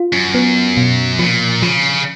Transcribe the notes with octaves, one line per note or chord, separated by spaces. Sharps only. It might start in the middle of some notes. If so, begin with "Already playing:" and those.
Already playing: F4
F#2
B3
B2
A#2 F3
C#3 F3